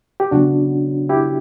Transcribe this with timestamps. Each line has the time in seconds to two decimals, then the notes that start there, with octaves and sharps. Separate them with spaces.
0.20 G4
0.31 C#3 F#3 B3 D4 F#4
1.09 E4 G4